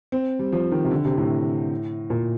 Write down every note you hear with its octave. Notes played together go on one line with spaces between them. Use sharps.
C4
G3
F3
D#3
C3
D3
C3
A2
A#2